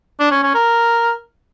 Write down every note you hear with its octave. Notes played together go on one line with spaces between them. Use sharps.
D4
C#4
C#4
A#4